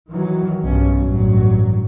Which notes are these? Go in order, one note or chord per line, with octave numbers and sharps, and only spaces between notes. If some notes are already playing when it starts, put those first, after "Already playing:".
D#3 E3 F#3
B1 G2 B2 C#4
A1 G2 F#3